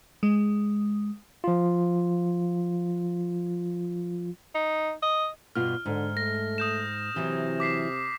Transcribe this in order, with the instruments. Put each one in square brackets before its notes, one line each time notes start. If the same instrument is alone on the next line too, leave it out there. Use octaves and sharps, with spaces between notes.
[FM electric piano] G#3
[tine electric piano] F3 F4
[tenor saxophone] D#4
D#5
[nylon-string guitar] G2 B2 F4 [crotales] F6
[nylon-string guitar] G#2 [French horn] D3
[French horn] A3 [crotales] A#6
[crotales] D#6 G6 E7
[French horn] C3 [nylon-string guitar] E3 F#3
[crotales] D6 B6 C7